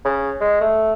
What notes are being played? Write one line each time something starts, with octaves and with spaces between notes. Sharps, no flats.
C#3
G#3
A3